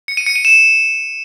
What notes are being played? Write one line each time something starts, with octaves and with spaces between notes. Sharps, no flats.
C#7
D#7
C#7
D#7
E7